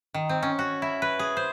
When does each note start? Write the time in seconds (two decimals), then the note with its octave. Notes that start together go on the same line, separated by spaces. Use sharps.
0.14 D#3
0.29 C4
0.43 C#4
0.59 F#4
0.82 E4
1.02 B4
1.19 G#4
1.37 C5